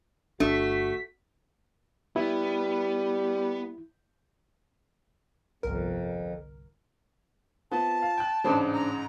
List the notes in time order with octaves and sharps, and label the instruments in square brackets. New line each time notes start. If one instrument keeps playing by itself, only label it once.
[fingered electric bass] G1 D4 [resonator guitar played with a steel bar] A3 [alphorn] F#4 [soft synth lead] B6
[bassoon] G3 [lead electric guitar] B3 [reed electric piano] E4
[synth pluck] G1 C2 A#4 [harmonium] F2
[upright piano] B3 [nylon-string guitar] C4 F4 C5 [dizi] A5
[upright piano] F5
G5 F#6
[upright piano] A1 G#2 C#3 [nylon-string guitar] C4 D4 C5
[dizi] A#5